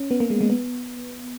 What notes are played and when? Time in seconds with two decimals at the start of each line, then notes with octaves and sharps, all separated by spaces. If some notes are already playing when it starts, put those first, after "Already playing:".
Already playing: C#4
0.11 B3
0.20 A#3
0.30 G#3
0.41 G#3
0.50 B3